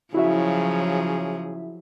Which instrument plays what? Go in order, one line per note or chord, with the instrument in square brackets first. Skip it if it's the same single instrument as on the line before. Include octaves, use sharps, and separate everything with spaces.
[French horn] C#3 [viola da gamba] F3 F#3 G#4 [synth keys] E4 F#4 E5